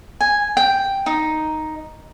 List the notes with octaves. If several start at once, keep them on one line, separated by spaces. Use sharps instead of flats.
G#5
G5
D#4